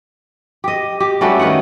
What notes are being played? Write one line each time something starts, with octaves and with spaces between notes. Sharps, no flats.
G4 D#5
G4
G3 A3 C#4 F#4
D#3 D#4 B4 F#5